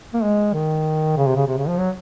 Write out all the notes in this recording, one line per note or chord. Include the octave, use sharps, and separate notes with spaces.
A#3
G#3
D#3
C#3
C3
C#3
C3
C#3
F3
F#3